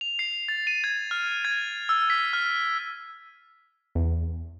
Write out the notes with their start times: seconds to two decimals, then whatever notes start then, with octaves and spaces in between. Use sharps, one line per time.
0.01 F7
0.19 C7
0.48 A6
0.67 D#7
0.84 G#6
1.11 F6
1.45 G#6
1.89 E6
2.10 B6
2.33 F6
3.95 E2